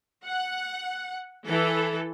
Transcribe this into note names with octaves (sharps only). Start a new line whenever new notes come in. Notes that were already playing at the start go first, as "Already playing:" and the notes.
F#5
E3 A4